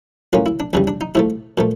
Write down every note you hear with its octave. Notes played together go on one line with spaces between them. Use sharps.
A2 F#3 A#3 C#4 F4
E4
D4
E2 C#3 E3 G3 D4
D4
D#4
G#2 F3 A3 E4
A#2 F3 A3